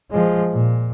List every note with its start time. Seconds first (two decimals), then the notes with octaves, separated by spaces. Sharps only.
0.11 F3 G#3
0.51 A#2